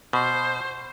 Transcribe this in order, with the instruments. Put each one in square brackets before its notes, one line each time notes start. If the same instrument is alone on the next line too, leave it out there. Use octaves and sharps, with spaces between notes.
[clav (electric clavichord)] B2 [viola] C5